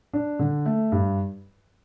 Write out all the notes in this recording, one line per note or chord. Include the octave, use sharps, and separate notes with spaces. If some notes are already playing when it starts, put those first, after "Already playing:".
D4
D3
A3
G2